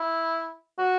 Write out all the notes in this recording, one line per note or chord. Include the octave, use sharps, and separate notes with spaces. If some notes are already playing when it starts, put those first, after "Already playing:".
Already playing: E4
F#4